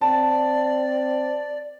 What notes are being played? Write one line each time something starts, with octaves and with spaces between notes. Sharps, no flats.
C4 D5 A5